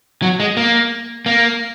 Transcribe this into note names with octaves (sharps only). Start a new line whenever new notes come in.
F#3
G#3
A#3
A#3